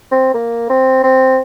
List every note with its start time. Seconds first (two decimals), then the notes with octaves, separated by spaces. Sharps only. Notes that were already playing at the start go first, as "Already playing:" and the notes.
0.11 C4
0.34 A#3
0.69 C4
1.04 C4